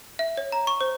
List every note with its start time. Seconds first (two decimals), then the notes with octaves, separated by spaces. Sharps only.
0.19 E5
0.37 C#5
0.52 A#5
0.67 C#6
0.81 C5